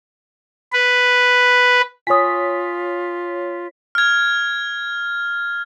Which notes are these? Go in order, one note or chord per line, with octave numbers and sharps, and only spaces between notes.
B4
F4 C#5 G#5 D#6 B6
F6 G#6